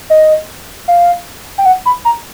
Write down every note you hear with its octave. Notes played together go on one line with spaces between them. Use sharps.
D#5
F5
G5
F#5
B5
A#5